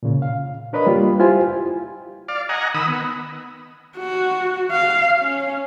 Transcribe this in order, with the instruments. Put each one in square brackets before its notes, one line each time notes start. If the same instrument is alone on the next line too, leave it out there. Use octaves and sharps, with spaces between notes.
[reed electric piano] A#2 C#3
F5
D4 A#4 B4 C#5 D#5 B5
G3 A#3 F4
E4 F4 G4 C5 G#5
[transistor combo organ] D5 F5
D#5 F#5 G#5 A#5
D#3 B5 D#6 E6
B3
[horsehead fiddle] F#4
F5
C#4